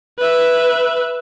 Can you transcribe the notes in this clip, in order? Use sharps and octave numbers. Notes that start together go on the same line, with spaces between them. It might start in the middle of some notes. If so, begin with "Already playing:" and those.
B4 E5